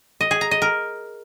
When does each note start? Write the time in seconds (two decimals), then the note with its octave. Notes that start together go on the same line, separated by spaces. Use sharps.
0.21 D#5
0.31 G#4
0.41 A#5
0.51 D#5
0.62 A#4